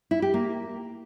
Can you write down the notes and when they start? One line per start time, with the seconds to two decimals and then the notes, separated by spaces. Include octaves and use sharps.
0.11 E4
0.22 G4
0.34 A#3